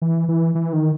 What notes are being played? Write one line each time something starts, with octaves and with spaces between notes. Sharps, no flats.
E3
E3
E3
D#3